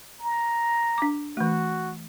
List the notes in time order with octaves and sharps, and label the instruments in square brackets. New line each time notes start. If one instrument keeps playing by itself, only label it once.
[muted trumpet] A#5
[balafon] D4 D6
[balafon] E3 A3 [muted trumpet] F#4